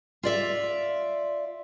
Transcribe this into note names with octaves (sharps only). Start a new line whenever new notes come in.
F4 D5 E5